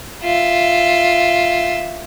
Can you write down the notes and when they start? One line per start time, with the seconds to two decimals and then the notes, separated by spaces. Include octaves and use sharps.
0.23 F4 E5